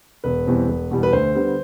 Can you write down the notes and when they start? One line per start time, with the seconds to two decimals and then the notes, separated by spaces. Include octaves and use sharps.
0.24 E1 B4
0.47 E2 B2 G3 C4
0.68 E1
0.91 E2 B2 G3 B3
1.03 B4
1.13 D2 C5
1.35 D3 G3 B3